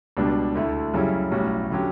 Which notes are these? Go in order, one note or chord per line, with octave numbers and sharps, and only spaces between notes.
C#2 B2 G3 D4
D2 D3 A3 E4 A4
F#2 C#3 G3 C#4 E4
B1 A2 G3 C#4 F#4
D3 F#3 C#4 G4